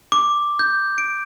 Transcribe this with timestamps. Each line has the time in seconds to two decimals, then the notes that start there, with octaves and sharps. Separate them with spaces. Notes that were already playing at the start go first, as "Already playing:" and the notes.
0.12 D6
0.59 G6
0.98 D7